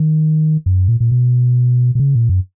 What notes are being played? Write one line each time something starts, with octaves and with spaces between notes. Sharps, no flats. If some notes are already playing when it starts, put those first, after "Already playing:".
Already playing: D#3
F#2
A#2
A#2
B2
B2
C#3
A#2
F#2